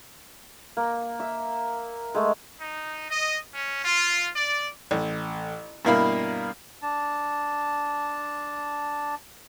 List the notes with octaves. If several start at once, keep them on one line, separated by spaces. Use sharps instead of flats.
A#3
E5
G#3 A3
D#4
D#5
C#4
F4
D5
A1
G2 B2 A#3 E4 F5 B5
D4 A5